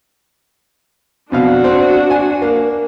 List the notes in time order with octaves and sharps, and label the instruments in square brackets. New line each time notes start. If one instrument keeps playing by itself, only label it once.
[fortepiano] F2 B2 F5 [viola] D4 F#4
[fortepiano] C4
G#5
A#3